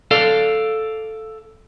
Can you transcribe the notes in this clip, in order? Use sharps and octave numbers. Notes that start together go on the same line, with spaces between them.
A4 D5 F5